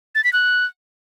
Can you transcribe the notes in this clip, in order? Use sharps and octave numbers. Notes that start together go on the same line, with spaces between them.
A6
B6
F#6